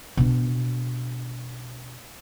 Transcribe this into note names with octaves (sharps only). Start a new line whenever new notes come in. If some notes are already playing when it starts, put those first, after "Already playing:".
B2 D4